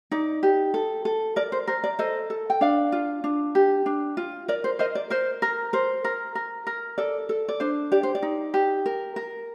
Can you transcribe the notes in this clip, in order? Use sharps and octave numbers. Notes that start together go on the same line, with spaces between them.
D#4 D5
G4
A4
A4
A#4 D5
C5
A#4 C5
D5
A4 C5 D#5
A4
G5
D4 D5 F5
F4
D4
G4
D4
F4
A#4 D5
C5
A#4 C5 D#5
D5
A#4 C5
A#4
A#4 C5
A#4
A#4
A#4
A4 D5
A4
D5
D4 C5
G4 D5
C5
D5
D#4
G4
A#4
A#4